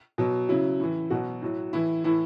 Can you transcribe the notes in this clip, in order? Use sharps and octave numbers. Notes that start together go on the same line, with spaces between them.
B2 F#3
C#3 F#3 E4
A2 E3
B2 F#3 F#4
A2 F#3
A2 E3 E4
A2 E3 E4